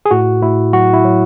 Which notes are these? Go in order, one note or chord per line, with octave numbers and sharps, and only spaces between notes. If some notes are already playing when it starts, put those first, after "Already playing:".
G#4
A2 F#4
A2 E4
F#3 F#4
E4
F#3